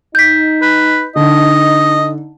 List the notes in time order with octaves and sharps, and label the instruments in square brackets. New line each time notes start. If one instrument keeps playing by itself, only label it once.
[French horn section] D#4 [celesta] G6 B6
[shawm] B4
[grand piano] D3 [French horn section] D#4 [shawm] D#5